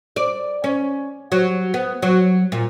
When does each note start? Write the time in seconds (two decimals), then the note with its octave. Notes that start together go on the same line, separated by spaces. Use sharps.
0.16 D5
0.64 C#4
1.32 F#3
1.74 B3
2.02 F#3
2.52 A#2